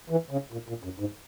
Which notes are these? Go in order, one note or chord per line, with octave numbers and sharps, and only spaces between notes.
E3
C#3
A#2
A#2
F#2
G#2